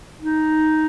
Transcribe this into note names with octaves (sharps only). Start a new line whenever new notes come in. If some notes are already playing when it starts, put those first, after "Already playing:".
D#4